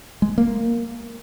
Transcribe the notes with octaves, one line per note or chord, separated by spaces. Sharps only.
G#3
A#3